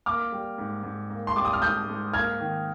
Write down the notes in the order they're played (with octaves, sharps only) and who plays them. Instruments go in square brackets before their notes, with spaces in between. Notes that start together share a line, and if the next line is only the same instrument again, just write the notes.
[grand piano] A#3 D6 F6
G3
G#2
G#2
A#3
C6
G3 D6
D#6
F6
G#2 D#6 G6
G#2
A#3 F6 G#6
D#3